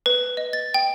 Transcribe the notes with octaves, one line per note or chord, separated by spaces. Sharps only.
B4
D#5
A6
G5